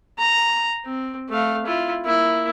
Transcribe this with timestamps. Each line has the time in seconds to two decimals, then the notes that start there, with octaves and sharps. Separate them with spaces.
0.19 A#5
0.85 C4
1.30 A3 F5
1.66 E4 F4
2.06 A#3 E4